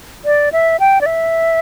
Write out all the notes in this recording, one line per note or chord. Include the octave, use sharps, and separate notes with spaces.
D5
E5
G5
D5
E5